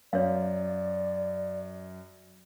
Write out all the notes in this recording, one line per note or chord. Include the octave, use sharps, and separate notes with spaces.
F#2 C#5 D5 F5